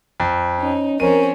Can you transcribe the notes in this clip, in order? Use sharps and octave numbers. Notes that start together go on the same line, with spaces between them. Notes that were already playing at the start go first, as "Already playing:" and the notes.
F2
C#4 D#4
F3 C4 C#4 A#4 D#7